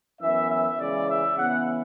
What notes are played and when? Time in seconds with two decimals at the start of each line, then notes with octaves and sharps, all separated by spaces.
0.21 F#2 E3 B3 E5
0.50 E5
0.79 C#3 E3 G#3 D5
1.08 E5
1.37 C#3 E3 B3 F#5